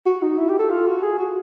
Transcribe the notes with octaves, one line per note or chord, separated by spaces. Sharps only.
F#4
D#4
E4
G4
A4
F4
F#4
G#4
F#4